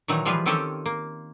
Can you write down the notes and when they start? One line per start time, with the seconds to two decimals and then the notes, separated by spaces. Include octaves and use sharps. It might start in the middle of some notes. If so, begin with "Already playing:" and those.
0.08 A#2 D#3 E3 F#3 D#4 A#5
0.25 E3 F3 G3 F4 G#4 B4
0.46 D#3 C4 C#4 G4 A4 G#5
0.86 A#3